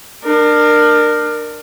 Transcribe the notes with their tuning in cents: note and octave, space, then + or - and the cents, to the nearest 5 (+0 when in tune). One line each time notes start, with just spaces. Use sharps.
D4 +35 A#4 +0